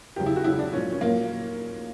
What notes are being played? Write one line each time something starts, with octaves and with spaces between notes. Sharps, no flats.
E2 C#3 F#3 G4
E4
F#4
E2 C#3 F#3 E4
D4
A#2 F#3 C#4
C#4
A#2 F#3 A#3